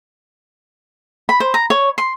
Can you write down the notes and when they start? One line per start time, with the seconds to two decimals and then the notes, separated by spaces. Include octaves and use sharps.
1.29 B5
1.40 C5
1.54 A#5
1.70 C#5
1.98 C6